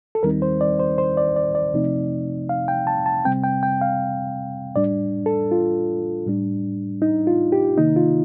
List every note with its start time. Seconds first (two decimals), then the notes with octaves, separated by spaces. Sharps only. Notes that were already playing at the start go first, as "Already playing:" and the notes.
0.15 A4
0.23 D#2 D#3 G3 C4 D#4 A#4
0.42 C5
0.61 D5
0.79 C5
0.98 C5
1.17 D5
1.36 D5
1.55 D5
1.74 C3 F3 A3 C4 D#4
2.49 F5
2.68 G5
2.87 A5
3.06 A5
3.25 C3 G3 C4 G5
3.43 G5
3.63 G5
3.81 F5
4.75 A2 G3 D4 D5
5.26 A4
5.51 F4
6.27 A2 G3 D4
7.02 D#4
7.27 F4
7.52 G4
7.77 C3 D#3 A#3 D#4
7.96 F4